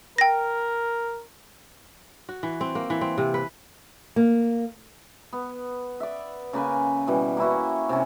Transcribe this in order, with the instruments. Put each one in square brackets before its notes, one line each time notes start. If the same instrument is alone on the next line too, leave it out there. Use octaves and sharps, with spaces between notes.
[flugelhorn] A#4 [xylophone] G5 A#6
[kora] F#4
E3
C4
A#3
E3
C4
C3
B4
[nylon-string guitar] A#3
[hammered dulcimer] B3
D5 E5
C#3 A#3 B4 G#5
B2 E3 G3
A#3 C#4 E4 F#4
C3 C#4